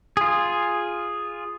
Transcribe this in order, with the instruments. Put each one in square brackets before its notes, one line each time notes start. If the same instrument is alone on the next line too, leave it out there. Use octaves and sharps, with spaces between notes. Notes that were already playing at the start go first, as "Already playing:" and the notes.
[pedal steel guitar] F4 G#4